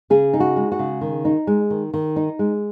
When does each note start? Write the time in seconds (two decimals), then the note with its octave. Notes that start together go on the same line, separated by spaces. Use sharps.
0.10 C#3 G#4
0.33 D#4
0.40 F#4
0.56 G#3
0.72 F#4
0.79 C#3
1.01 D#3
1.25 D#4
1.47 G#3
1.70 D#3
1.94 D#3
2.16 D#4
2.39 G#3